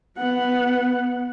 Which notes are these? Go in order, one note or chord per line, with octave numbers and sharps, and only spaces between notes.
B3 F#5